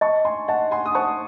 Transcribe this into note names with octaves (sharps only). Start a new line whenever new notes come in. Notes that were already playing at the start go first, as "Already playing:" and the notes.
D#5 A5 C#6
G#5 C6
D#5 F#5 A5
G#5 C6
D#6
C5 A5 C#6